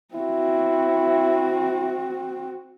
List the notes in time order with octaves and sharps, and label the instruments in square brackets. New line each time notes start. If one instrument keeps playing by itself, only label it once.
[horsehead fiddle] C4 F#4 [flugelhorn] E4